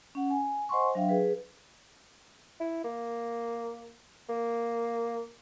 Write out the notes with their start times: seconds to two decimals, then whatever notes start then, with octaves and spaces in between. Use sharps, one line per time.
0.15 C#4 F#5
0.30 G#5
0.69 C5 D#5 F#5 G#5 C6 C#6
0.95 F#3 D4 E5 F5 G5
1.09 G#4 B4
2.60 E4
2.84 A#3
4.29 A#3